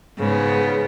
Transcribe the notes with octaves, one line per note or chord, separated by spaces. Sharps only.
G#2 C#3 B3